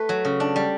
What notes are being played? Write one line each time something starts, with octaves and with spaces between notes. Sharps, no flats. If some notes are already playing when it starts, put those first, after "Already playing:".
Already playing: A3 B4
F#3
C#3
D4
G3